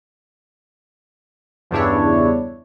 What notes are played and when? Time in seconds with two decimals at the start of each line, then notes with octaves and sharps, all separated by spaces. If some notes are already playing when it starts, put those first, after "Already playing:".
1.71 E2 G2 C#3 D4 E4 C#5